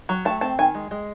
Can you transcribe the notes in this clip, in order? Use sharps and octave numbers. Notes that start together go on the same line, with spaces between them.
F#3
A3 A5
C4 A5
D#3 G#5
G#3
G#3